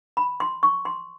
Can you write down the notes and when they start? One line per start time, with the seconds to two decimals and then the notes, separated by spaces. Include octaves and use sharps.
0.17 B5
0.40 C6
0.63 C#6
0.85 C6